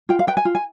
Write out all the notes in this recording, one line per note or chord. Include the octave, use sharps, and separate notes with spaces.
F4 G5
F5
B4 G5
G#5
F4
G#5